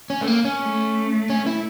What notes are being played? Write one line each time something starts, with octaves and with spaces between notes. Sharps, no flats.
C#4
A3
A#3
C#4
A3
C#4
E4